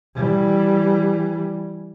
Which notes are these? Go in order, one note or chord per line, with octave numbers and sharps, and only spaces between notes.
E3 G3